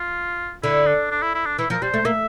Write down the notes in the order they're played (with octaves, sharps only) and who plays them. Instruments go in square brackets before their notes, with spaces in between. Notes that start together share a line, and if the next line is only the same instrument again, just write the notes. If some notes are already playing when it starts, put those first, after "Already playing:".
Already playing: [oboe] F4
[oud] D3 [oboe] E4
[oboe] D4
D4
E4
E4
D4
[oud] E3 [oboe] E4
[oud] F3 [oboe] A#4
[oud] G3 [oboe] C5
[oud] A3
[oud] A#3 [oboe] E5